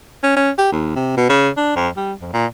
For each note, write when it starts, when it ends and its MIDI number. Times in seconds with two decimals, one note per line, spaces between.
0.23 0.35 61
0.36 0.50 61
0.58 0.72 67
0.72 0.95 39
0.96 1.12 48
1.17 1.29 47
1.29 1.49 49
1.57 1.75 62
1.76 1.88 41
1.97 2.13 55
2.21 2.32 41
2.33 2.46 46